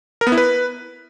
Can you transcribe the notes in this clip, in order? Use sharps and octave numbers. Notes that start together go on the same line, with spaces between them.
A#4
B3
E4
B4